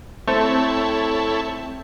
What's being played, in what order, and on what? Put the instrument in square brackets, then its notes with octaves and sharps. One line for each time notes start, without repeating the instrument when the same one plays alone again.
[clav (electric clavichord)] A3 [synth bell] C4 [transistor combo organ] E4 A4 C#5